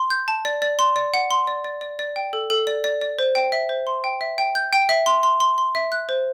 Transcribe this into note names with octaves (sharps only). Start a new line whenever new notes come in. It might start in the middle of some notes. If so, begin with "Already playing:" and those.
Already playing: C6
G6
A5
D5
D5
C6
D5
F#5
C6
D5
D5
D5
D5
G5
A4
A4
D5
D5
D5
C5
G5
E5
C5
C6
G5
E5
G5
G6
G5
E5
C6
C6
C6
C6
E5
F#6
C5